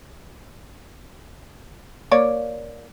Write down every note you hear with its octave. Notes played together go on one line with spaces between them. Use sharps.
A#3 C#5 D5